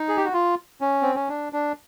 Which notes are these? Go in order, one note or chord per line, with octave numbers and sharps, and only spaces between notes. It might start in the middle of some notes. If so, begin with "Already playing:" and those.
Already playing: D#4
G#4
G4
F#4
F4
C#4
C4
C#4
D4
D4